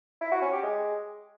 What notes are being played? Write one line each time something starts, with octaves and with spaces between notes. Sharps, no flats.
E4
F#4
C#4
G4
G#3